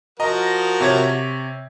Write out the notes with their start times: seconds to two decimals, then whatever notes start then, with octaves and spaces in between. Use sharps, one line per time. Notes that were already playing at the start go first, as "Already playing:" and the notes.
0.20 F3 F#4 A#4 D#5 A#5
0.80 C3 C#5 G#6